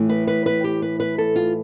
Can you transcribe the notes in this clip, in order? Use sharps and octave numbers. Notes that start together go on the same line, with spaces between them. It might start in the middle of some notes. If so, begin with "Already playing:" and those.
Already playing: A2 E3 A3
B4
B4
B4
G4
B4
B4
A4
F4